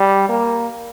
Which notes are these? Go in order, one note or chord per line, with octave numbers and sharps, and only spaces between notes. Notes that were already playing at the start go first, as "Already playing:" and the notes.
Already playing: G3
A#3